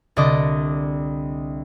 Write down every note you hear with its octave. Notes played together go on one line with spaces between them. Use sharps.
C2 D3 D5 D#5 D6